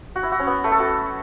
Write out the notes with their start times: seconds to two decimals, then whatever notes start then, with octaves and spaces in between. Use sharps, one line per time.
0.16 F#4
0.23 E4
0.32 F#4
0.40 C#4
0.47 B3
0.64 A3
0.72 A4
0.80 F#4